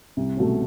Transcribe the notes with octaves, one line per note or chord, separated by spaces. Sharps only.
C2
B2 F#3 A3 C#4